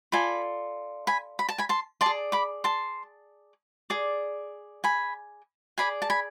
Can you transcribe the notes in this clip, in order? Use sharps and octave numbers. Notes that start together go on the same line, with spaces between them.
F4 A4 D5 G#5 B5
G#5 B5
B5
A5
G#5 B5
A5 C6
D5 A5 C6
G#4
B5 D6
A5 C6
G#4 D5
G#5 B5
G#4 D5 G#5 B5
A5
G#5 B5